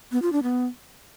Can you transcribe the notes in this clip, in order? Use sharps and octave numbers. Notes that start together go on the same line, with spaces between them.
B3
F4
D4
B3